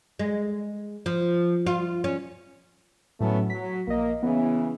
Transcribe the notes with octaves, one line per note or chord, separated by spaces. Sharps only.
G#3
F3
F4
C#4
A2 F#3 A3 B3 C#4
F#3 B6
A#1 A#3 D#5
C#3 E3 B3